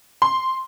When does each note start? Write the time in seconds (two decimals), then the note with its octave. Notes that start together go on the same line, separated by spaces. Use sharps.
0.22 C6